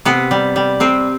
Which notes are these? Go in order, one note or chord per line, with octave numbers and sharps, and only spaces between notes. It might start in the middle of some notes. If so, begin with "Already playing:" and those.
C3 B3
G3
G3
C3 C4